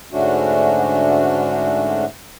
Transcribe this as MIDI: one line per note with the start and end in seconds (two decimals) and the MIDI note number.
0.12 2.05 44
0.12 2.05 50
0.12 2.05 57
0.12 2.05 61
0.12 2.05 62
0.12 2.05 66